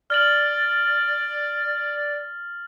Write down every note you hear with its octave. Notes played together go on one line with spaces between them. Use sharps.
D5 F6 A6 F#7